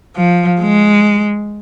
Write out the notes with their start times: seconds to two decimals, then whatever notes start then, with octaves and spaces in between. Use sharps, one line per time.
0.16 F3
0.61 G#3